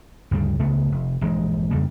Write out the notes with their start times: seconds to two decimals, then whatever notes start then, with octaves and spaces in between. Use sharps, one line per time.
0.31 D2 G2 C#3 G3
0.60 C#2 C#3 A3 B3
0.92 F1
1.21 A#1 G2 E3 G#3
1.71 F2 C#3 G3 A#3